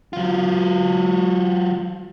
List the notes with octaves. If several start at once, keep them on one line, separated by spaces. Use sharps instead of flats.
F#3 F4